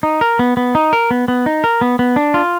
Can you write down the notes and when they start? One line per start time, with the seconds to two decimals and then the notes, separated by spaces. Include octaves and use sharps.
0.03 D#4
0.21 A#4
0.39 B3
0.57 B3
0.75 D#4
0.93 A#4
1.11 B3
1.28 B3
1.46 D#4
1.64 A#4
1.81 B3
1.99 B3
2.16 D4
2.34 F4